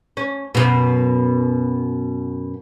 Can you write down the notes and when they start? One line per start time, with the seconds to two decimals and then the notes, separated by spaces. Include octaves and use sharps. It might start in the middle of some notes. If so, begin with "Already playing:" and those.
0.17 C#4
0.55 F#2 B2